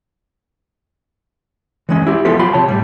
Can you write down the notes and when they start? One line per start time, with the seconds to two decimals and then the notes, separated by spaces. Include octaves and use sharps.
1.89 E3 G#3 C#4
2.07 E4 G4
2.25 F3 B3 F4 G4 A4 E5
2.39 F#3 F4 B5 C6
2.53 C3 C#5 A5
2.68 A2 G3